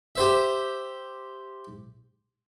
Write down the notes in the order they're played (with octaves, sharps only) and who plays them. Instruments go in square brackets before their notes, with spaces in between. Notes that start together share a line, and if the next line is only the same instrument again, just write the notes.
[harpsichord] G4 C5 E5